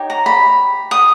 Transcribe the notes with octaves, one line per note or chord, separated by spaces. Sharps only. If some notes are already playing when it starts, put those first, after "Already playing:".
Already playing: D#4 G4 C#5
A#5
B5
D#6